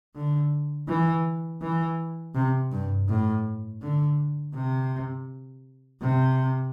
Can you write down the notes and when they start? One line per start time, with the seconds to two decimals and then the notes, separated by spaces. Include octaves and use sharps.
0.15 D3
0.88 E3
1.61 E3
2.35 C3
2.72 G2
3.08 A2
3.82 D3
4.54 C3
6.01 C3